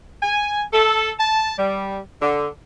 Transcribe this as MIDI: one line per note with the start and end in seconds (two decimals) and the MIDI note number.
0.23 0.62 80
0.73 1.11 69
1.19 1.54 81
1.59 1.99 55
2.22 2.48 50